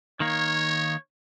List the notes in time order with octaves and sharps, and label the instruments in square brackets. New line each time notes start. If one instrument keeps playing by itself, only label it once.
[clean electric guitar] D#3 A#3 [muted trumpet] C#5